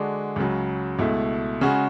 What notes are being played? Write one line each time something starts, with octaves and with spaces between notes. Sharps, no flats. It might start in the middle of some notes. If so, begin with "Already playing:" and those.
Already playing: D3 G#3 D4 F#4
C#2 C#3 F#3
C#2 B2 A3 E4
C#3 G#3 C#4 F#4